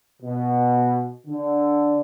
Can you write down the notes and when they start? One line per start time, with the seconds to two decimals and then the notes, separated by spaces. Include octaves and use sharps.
0.23 B2
1.26 D3